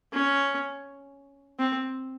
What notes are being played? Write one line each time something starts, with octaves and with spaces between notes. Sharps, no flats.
C#4
C4